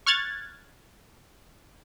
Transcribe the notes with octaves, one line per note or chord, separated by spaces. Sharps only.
C#6 F6 F#6 G#6 A6